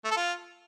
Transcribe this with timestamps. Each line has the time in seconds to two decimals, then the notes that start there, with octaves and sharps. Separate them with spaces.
0.05 A3
0.11 A4
0.17 F4